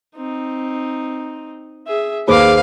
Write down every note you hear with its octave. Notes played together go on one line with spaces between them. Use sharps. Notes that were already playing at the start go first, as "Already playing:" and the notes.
C4 D#4
G#4 E5
D#2 G#4 B4 C5 F5 B5 D6